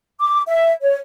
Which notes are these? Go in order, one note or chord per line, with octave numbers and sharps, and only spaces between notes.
D6
E5
C#5